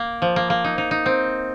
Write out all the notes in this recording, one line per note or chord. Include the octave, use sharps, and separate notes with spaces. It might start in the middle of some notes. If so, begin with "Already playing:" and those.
Already playing: A#3
F3
A#3
A#3
D#4
D#4
D#4
C4